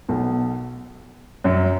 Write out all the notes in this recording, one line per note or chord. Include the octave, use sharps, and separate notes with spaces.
B1 B2
F#2 F#3